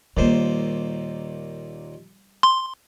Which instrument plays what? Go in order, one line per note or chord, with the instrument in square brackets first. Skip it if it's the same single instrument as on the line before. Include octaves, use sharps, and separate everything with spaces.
[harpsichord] D#2 A#2 C5 [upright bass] G3 A#3
[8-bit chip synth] C6